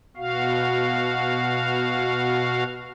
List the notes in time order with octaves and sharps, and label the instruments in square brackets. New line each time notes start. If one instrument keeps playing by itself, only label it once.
[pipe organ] B2 F#4 F5